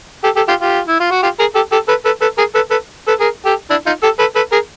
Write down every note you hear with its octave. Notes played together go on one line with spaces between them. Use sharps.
G4 A4
G4 A4
F4 G4
F4 G4
E4
F4
F#4
F4 G4
G#4 A#4
G4 A4
G4 A4
A4 B4
A4 B4
A4 B4
G#4 A#4
A4 B4
A4 B4
A4 B4
G#4 A#4
G4 A4
D4 E4
D#4 F4
G4 A4
A4 B4
A4 B4
G#4 A#4